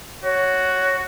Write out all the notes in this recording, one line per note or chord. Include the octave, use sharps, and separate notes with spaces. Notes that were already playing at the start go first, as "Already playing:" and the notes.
F#4 C#5